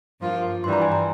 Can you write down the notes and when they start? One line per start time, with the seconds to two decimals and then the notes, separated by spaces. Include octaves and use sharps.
0.20 G2 F3 A#3 F4
0.63 G2 E3 G3 C6
0.73 A#5
0.82 G#5
0.92 A#5